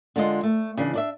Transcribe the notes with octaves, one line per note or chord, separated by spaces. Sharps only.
D3 G#3 F4 D#5
A3
C#3 E3 D4
D4 D5 E5